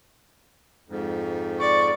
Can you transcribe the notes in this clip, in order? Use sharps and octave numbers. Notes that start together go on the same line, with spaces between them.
F2 G#2
D5 C#6